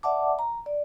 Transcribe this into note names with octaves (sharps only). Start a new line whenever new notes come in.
D5 E5 F#5 A5 D6
A#5
D5